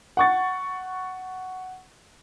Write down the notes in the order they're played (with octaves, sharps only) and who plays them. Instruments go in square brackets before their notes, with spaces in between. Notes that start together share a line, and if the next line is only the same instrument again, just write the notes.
[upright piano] F#5 C#6 A6